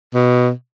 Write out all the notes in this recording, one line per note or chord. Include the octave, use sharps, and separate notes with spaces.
B2